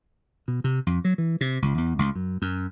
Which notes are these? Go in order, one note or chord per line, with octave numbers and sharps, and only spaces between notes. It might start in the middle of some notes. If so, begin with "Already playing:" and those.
B2
C3
F2
F#3
E3
C3
C#2
E2
C#2
F#2
F#2